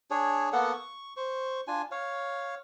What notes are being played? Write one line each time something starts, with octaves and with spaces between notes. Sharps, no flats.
D4 G#4 C#5
A#3 B3 A4 F#5
C#6
C5 C#6
D4 F4 G#5
C#5 F5